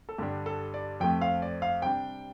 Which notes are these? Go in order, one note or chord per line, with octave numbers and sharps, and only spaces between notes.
A4
G2 D3 G3 D4 G4
A4
D5
F2 F3 A3 G5
F5
D5
F5
C3 G3 D4 G5